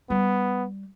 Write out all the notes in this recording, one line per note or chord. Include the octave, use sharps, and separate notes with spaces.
G3 B3